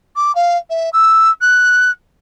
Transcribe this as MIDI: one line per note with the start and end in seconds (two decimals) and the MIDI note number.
0.16 0.34 86
0.35 0.57 77
0.70 0.90 76
0.93 1.31 88
1.41 1.91 90